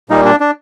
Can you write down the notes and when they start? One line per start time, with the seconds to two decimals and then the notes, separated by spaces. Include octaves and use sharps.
0.09 A#2 G3 A#3 D#4
0.25 D4
0.40 D4